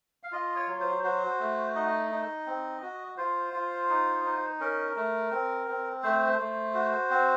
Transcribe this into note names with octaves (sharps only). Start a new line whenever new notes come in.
F5
F4 D#5
C#5
F#3
C5
F#4 C5
A3
D#4 D#5
D#4
C4
F#4
F4 C5
F4
D#4
D#4
C#4 A#4
A3
C4
C4
A3 C5
A3
F#4
C4